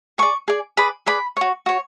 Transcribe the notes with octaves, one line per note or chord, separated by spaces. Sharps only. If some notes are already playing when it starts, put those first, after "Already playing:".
G#4 D5 C#6
G#4 D5
G#4 B4 D5 B5
G#4 B4 D5 B5
F#4 C#5
F#4 C#5